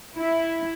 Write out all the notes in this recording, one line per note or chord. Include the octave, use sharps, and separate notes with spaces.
E4